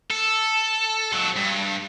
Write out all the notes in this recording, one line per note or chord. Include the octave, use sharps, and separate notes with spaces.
A4
F#3 A4
G2